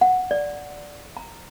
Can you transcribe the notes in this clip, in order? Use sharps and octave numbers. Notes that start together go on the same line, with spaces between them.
F#5
D5
A#5